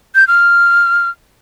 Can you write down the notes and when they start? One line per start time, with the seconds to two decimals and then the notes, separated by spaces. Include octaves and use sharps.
0.15 G6
0.28 F6